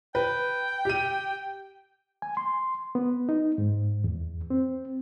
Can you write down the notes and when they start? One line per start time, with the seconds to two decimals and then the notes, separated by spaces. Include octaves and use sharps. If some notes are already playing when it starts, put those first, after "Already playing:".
0.15 B4 G5
0.85 G4 D#7
2.22 G#5
2.37 C6
2.95 B3
3.29 D#4
3.58 G#2
4.04 E2
4.50 C4